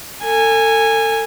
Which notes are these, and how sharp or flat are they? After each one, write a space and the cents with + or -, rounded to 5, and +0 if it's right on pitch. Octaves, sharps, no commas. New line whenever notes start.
A4 +35 G#5 -10